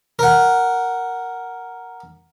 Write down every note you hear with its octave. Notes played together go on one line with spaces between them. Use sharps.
A#4 F#5